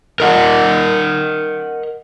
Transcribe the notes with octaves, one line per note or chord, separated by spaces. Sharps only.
A#4 D#5 F#5